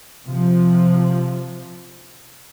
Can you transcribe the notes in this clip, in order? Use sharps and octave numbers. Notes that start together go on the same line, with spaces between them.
C3 F3